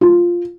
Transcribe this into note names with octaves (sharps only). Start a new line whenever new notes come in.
F4